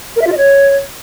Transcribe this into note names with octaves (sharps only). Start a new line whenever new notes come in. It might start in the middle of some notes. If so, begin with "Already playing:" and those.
A#4
E5
F4
D#5
C#5